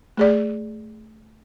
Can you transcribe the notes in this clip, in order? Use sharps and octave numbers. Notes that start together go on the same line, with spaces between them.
A3 G#4 D5